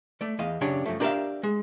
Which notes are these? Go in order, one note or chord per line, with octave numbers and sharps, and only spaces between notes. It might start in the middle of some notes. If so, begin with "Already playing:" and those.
A3 D5
E2 D#5 F5
F#2 C#3 D4 G4 C#5
F#2 F3 A3
D4 G4 A#4 D5 E5 F5
G#3